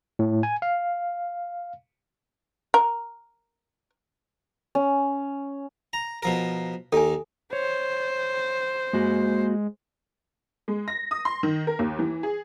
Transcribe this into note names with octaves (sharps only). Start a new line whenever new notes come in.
A2
G#5
F5
A#4
C#4
A#5
B2 F3 A#4
D#2 D#3 A4 G#5
C5 C#5
G#3 A#3 F#4
G#3
A#6
D#6
C6
D#3
A#4
D#2
E3
G#4